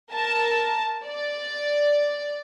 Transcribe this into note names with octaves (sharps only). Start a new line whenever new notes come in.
A#4 A5
D5